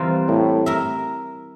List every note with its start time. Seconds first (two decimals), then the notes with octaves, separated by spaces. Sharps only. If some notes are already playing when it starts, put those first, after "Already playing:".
Already playing: E3 G3 C4 F4 A#4
0.28 A2
0.66 A#4 E5